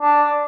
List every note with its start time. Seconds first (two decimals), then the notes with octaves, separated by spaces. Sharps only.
0.01 D4